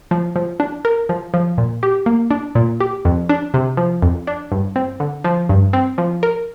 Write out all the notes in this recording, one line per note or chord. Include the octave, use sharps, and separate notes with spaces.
F3
F3
D4
A#4
F3
F3
A#2
G4
A#3
D4
A#2
G4
F2
D4
C3
F3
F2
D4
G2
C4
D3
F3
G2
C4
F3
A#4